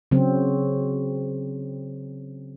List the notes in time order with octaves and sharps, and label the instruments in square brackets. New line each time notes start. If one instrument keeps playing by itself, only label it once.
[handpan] C#3 F#3 C4